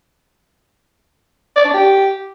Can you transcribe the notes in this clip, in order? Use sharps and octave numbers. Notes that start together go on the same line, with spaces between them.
D5
D4
G4